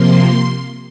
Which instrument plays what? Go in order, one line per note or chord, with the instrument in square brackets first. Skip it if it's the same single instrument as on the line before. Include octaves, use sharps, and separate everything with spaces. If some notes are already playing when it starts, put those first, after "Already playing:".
Already playing: [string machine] C3 F3 A#3 C6